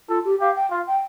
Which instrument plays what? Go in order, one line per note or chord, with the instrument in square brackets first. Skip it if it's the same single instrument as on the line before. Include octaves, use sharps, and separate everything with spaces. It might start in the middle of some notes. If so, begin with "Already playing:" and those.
[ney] F4 [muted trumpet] A4
[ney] G4
[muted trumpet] G4 [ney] F5
[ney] G5
[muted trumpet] F4 [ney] F5
[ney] G5